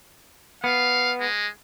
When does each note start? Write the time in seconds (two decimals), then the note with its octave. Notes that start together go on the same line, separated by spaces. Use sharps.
0.64 B3 F5
1.20 G#3